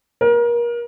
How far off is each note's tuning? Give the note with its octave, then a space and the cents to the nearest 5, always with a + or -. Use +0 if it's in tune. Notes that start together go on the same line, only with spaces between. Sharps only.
A#4 +30